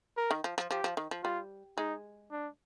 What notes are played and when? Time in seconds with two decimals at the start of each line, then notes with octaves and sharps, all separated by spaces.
0.17 A#4
0.31 D#3
0.44 F3
0.58 F3
0.71 F3 G4
0.84 F3
0.97 D#3
1.11 F3
1.24 G3 F4
1.78 G#3 D#4
2.32 D4